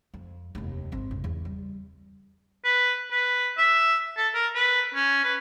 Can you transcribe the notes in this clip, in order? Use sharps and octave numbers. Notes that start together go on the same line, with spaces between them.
F2
F1 D#2
G#1 C4
F2 C#3
E2
G3
B4
B4
E5
A4
A#4
B4
C#4
B4